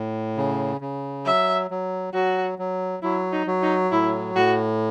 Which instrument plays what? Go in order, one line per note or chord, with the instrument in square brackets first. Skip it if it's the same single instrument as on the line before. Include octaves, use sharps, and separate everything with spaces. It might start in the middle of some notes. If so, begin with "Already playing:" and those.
Already playing: [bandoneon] A2
C#3
C#3
[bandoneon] F#3 [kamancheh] E5
[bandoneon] F#3
[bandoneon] F#3 [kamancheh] F#4
[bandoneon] F#3
[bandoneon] F#3 [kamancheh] E4
[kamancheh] D#4
[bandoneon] F#3
[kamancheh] D#4
[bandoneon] A2 [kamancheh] E4
[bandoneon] A2 [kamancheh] F#4